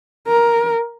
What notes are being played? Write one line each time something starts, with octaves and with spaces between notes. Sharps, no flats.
A#4